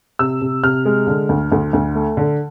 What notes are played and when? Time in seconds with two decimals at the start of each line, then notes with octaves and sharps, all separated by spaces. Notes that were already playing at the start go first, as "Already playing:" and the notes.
0.19 C3 E6
0.41 C3
0.64 C3 F6
0.85 G#3
1.07 D3
1.29 D2
1.52 D2
1.73 D2
1.95 A3
2.17 D3